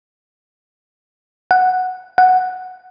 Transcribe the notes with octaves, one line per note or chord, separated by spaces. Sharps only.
F#5
F#5